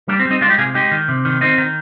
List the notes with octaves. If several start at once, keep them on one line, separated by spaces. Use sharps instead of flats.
G3 A#3 D4
C4
G3
C4 D#4
G#3 D4 F4
D#4 G4
C3 F4 G#4
G#3 D#4 G4
D#3
C3
D#3
D#3 C4 D#4
D#3